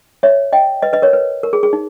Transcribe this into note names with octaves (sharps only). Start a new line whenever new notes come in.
C#5 E5
D#5 G5
B4 D#5
B4 D#5
A#4 C#5
B4
A#4
G#4
G#4
D#4